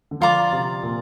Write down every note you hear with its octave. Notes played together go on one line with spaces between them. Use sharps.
D3
F3 F4 D5 A#5 D6
C3
A#2